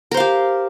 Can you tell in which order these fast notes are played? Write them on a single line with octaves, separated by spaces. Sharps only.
A#4 C5 F5 G4